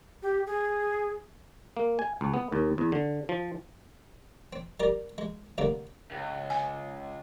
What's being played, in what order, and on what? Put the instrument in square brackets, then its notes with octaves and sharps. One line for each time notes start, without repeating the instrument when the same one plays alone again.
[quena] G4
G#4
[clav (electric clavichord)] A#3
G#5
C#2
B3
D#2
E2
D3
F3
[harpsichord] C4
G3 A#4 D5
G#3
C2 A2 D3 A#3
[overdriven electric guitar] C#2
[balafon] G#5